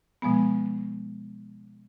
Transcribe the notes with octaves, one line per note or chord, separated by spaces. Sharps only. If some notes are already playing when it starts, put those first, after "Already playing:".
B2 F3 G#3 B3